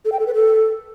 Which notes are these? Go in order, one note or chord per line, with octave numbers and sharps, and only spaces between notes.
A4
G5
A4
B4
A4